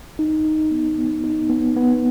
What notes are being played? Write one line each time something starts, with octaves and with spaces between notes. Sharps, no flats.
D#4
D#4
B3
B3
D#4
B3
B3